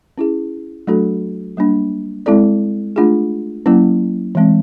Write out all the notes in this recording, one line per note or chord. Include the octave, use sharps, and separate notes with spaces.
C#4 E4 G#4
F#3 A3 D4 F#4 A4
G3 A#3 D4
G#3 C4 E4 A4 D5
A3 D4 F4 G#4
F#3 A#3 C#4 E4
E3 G#3 C4